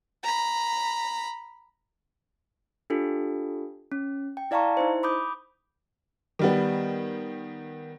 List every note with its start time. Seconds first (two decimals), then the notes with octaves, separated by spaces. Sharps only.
0.23 A#5 B5
2.90 D4 F4 G4 A4
3.92 C#4
4.37 G5
4.51 E4 D5 F5 A5 A#5 C#6
4.77 D#4 E4 C5
5.03 B5 D6 D#6 G6
6.39 D#3 G3 B3